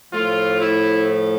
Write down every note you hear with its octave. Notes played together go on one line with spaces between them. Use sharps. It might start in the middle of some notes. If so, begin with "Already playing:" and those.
A2 F3 A3 F4
E4